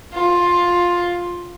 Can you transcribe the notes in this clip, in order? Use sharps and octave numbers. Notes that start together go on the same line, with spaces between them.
F4